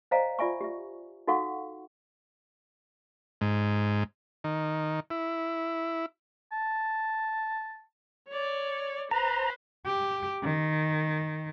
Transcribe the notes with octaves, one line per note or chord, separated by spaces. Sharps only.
C5 D5 D#5 F5 G#5 A#5
F4 D5 E5 G#5 C#6
G4 E5
D#4 F#4 A4 F5 F#5 C#6
G#2
D#3
E4
A5
C#5 D5
B4 C5 A#5
G4
D#3